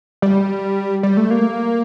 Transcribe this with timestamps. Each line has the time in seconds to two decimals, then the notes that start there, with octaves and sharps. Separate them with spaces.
0.22 G3
1.03 G3
1.17 A3
1.31 A#3